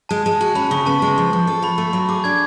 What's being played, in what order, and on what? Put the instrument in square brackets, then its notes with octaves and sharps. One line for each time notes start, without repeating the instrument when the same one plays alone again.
[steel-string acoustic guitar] G#3 [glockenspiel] A5
[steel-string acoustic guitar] G#3 [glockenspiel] A5
[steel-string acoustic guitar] F#4 [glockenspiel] A5
[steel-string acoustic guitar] C#4 [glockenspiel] B5
[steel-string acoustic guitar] C#3 [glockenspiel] C#6
[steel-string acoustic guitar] B3 [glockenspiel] A5
[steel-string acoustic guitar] G#3
F3
F3
A4
[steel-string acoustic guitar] F4 [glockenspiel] B5
[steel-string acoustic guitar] A3 [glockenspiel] A5
[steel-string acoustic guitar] F#3 [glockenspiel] B5
[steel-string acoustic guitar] G#4 [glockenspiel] D6
[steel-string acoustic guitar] D4 [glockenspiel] G#6